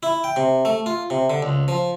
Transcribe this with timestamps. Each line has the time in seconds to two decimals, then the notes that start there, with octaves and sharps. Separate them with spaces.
0.03 E4
0.24 G5
0.36 C3
0.65 A3
0.86 F4
1.10 C3
1.30 D3
1.43 C#2
1.68 F3